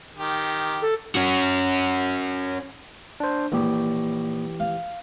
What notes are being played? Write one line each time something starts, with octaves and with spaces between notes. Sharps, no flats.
D#3 G4
A4
C#4 F#4
D4 C5
A#1 E3 G4
F5